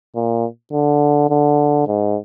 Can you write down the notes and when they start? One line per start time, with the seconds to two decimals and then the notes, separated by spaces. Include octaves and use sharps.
0.15 A#2
0.73 D3
1.30 D3
1.87 G#2